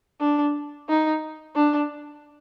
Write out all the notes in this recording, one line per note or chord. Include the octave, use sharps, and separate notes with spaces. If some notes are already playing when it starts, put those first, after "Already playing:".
D4
D#4
D4